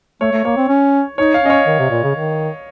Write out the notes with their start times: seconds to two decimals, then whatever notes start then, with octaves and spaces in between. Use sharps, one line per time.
0.21 A3 C#5
0.32 A3
0.45 A#3 C#5
0.57 C4
0.69 C#4
1.18 D#4 C#5
1.34 F5
1.42 C#4 D#5
1.50 C#5
1.67 D#3
1.79 C3
1.90 A#2
2.04 C#3
2.15 D#3